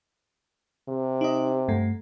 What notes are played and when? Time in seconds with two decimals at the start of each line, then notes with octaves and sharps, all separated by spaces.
0.89 C3
1.21 D#4 D#5
1.68 G2 A3